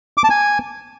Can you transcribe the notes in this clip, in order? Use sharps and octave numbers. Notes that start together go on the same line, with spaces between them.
D6
A5
G#5